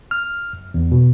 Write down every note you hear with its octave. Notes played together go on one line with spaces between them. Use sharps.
F6
F#2
E2
B2